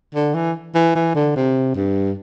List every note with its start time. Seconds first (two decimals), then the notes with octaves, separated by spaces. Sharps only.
0.15 D3
0.34 E3
0.75 E3
0.95 E3
1.15 D3
1.36 C3
1.76 G2